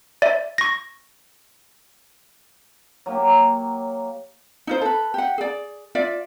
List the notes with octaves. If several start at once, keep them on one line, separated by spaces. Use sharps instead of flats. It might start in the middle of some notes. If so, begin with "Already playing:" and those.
D5 E5
C#6 A#6
F#3 A#3 G4
D#4 F4 C5
A4 B4
G4 F#5
G#4 D5
F4 D5 E5